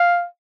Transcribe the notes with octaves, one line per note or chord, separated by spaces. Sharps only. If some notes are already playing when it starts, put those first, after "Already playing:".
Already playing: F5